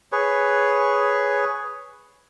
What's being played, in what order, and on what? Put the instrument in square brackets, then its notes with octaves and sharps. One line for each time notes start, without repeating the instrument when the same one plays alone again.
[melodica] G#4 B4 C#5